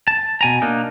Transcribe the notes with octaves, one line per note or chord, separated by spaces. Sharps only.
A5
B2 G#5 A#5
A#3 D4 D#4